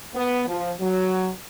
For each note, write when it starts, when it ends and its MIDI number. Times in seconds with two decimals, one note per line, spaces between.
0.15 0.43 59
0.47 0.71 53
0.81 1.29 54